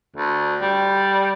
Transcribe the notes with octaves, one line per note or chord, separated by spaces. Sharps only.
D2
G3